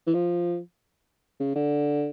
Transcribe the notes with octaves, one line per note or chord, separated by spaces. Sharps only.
E3
F3
C#3
D3